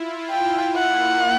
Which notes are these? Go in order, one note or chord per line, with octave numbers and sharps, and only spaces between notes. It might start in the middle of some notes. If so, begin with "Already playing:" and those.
Already playing: E4 F4
E4 G5
A#3 F#5